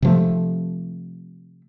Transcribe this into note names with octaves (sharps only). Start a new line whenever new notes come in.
C3 F3 A3